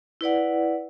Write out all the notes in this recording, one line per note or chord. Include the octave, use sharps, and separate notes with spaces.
E4 B4 D5 F#5